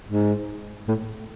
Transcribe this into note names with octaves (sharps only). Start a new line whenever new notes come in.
G#2
A2